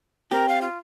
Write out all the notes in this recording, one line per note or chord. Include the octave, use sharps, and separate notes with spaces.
C4 G4 A#4
F5
F4